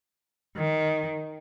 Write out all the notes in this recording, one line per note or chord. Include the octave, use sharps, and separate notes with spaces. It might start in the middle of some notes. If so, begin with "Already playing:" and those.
D#3